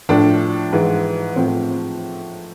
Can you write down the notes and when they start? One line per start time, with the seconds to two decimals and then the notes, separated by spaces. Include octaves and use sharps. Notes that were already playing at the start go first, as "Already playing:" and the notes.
0.09 A2 F3 D4
0.73 G#2 E3
1.36 A2 F3 C4